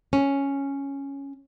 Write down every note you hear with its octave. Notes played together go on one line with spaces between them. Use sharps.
C#4